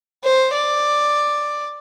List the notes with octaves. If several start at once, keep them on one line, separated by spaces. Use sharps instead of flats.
C5
D5